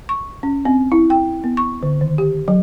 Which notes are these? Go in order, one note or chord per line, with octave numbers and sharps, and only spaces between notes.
C#6
C#4
C4
E4
G5
B3
C#6
D3
D#3
G4
F#3